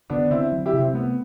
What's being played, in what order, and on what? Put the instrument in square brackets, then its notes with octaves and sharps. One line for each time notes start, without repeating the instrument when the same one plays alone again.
[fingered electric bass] D3 [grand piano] B3 D4
[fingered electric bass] D3 [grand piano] C4 E4
[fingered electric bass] F#3
[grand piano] E4 G4
[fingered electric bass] C3
[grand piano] C4
[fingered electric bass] A3 [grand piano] B3